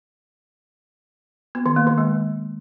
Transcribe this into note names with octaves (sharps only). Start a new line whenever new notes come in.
B3
D#3
A#3
D#3
G#3